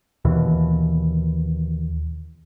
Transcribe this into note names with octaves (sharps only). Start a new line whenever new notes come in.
D#2 B2 E3